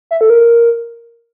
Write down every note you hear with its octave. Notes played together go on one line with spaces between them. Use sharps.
E5
A4
A#4